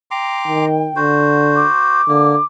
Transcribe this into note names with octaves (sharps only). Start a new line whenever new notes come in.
G5 A#5 C6 D6
D#3
D3 F#4 C5
D6
D3 A#3